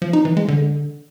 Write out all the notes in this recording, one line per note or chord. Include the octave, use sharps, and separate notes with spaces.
F3
D#4
E3
G#3
D3